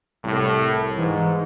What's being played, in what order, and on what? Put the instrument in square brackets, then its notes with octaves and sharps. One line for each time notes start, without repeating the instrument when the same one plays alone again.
[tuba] C2 [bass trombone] A2
[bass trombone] G#2 [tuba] E3